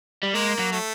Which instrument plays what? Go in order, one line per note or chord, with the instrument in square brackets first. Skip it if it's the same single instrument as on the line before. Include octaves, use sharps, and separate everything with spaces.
[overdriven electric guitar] G3
[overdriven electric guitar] G#3 [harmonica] A#3
[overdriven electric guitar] F#3
[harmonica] A3